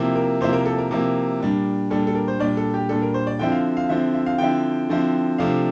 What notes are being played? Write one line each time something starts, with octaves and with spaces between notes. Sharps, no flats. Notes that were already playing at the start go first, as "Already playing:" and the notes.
Already playing: C3 F3 A#3 E4
A#4
C3 F3 A#3 E4 C5
A#4
A4
A#4
C3 F3 A#3 E4
A#2 G3 D4
A#2 G3 D4 A4
A4
A#4
C5
A#2 G3 D4 D5
A4
G4
A#2 G3 D4 A4
A#4
C5
D5
D3 F3 C4 E4 G5
F5
F5
D3 F3 C4 E4 E5
E5
F5
D3 F3 C4 E4 G5
D3 F3 C4 E4
C3 F3 A3 D4 F5